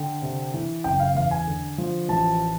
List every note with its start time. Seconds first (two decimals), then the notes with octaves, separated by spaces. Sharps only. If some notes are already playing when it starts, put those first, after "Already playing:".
Already playing: D3 G5
0.22 C3
0.54 E3
0.84 F#1 G5
1.00 F5
1.15 E2 F5
1.31 G#5
1.47 D3
1.78 F3
2.09 A1 A5